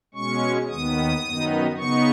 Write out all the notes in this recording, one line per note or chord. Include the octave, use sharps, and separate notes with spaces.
B2 G#3 C#4 C#6
D#2 D#3 B3 D#6
F#2 D#3 B3 D#4
C#3 B3 D#4 C#6